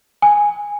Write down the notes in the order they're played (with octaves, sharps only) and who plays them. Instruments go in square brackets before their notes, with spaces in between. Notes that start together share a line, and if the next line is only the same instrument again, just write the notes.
[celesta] G#5